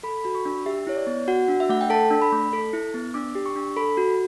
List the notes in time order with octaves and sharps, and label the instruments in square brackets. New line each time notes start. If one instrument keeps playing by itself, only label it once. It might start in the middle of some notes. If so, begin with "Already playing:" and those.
[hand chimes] A4 B5
F#4 B5
C#6
D4
G4 E5
E4 C#5
D5
B3
F#4 F#5
D4
E5
A3 F#5
G5
A4 A5
D4
B5
A3
A4
E4
B3
D4 D6
G4
C#6
D4
A4 B5
F#4